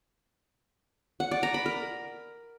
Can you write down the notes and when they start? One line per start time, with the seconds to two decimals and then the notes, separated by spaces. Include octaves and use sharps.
1.20 F#5
1.31 D5
1.43 A#5
1.54 B5
1.66 A#4